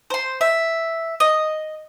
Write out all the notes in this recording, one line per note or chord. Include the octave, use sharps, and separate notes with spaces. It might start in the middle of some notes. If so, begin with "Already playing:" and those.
C5 C6
E5
D#5